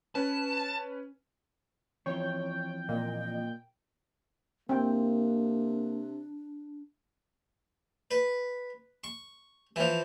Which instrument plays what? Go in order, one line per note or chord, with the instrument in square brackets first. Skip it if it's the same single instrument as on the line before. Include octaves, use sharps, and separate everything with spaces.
[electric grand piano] C#4 B4 [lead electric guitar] A5
[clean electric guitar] E3 F3 C4 [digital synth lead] C#5 [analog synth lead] G5
[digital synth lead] A#2 [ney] D#5
[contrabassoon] C3 [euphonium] A#3 [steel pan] C4 G5 [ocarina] D4
[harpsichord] B4
C#6
E3 F3